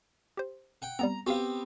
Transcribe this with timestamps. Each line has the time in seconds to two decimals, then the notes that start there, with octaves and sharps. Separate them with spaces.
0.37 G4 C5
0.82 F#5 G5
0.99 G3 B3 C4 A#5
1.27 B3 C4 F#4 G4 F5